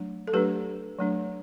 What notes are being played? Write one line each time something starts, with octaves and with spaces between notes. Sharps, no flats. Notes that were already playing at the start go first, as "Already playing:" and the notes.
Already playing: F#3 A3 D4
A4
F#3 A3 D4 G4 B4
F#3 A3 D4